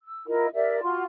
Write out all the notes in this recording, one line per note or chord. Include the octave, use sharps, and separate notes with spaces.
E6
E4 F4 A#4 D#5
G4 A#4 D5 E5
F4 F#4 C6